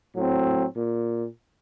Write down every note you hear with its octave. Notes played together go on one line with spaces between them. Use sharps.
A2 F#3 C4
A#2